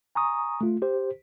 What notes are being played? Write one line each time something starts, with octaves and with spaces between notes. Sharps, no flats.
G#5 A#5 C#6 D#6
A3 F4
G4 C5